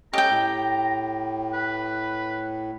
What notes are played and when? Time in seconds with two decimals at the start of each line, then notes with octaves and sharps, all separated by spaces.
0.13 C#4 G4 A4 D#5 G5 A#5
0.30 A2
1.54 B4